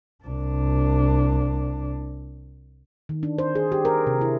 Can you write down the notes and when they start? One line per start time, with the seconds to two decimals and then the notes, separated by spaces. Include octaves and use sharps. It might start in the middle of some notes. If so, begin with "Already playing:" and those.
0.24 C2 D4
3.09 D#3
3.23 D4
3.39 C5
3.55 G#4
3.72 G4
3.85 A#4
4.07 C3
4.21 E4